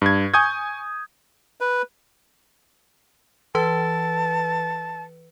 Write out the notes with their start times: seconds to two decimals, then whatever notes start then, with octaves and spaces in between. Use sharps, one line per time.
0.02 G2 G#6
0.34 G#5 C#6 D#6 G6 G#6
1.61 B4
3.55 E3 B4 A5